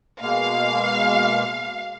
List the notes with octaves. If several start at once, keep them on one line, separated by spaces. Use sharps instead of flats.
B2 G#3 A#3 F5